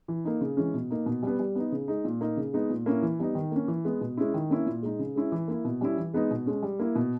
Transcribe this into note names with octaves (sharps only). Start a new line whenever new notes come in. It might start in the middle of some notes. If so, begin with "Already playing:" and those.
E3
A#3 D#4
C#3
E3 G#3 C#4
B2
A#3 D#4
B2
G3 B3
G3
B3 D#4
C#3
G#3 D#4
A#2
A#3 D#4
C#3
G#3 B3 D#4
A#2
A#3 C#4 E4
E3
G3 B3 D#4
D#3
A#3 C#4
E3
G#3 B3
B2
G#3 C#4 E4
D#3
A#3 C#4 E4
A#2
G#3 D#4
C#3
G#3 C#4 E4
E3
A#3 E4
B2
G3 C#4 E4
E3
G#3 B3 D#4
B2
G#3 C#4
G3
A#3 E4
B2